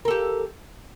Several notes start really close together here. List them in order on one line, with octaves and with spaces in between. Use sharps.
A#4 A4 G4